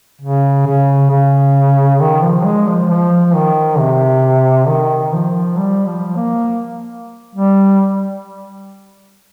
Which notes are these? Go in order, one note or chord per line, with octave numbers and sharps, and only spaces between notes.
C#3
C#3
C#3
D#3
F3
G#3
F3
F3
D#3
C3
D#3
F3
G3
F3
A#3
G3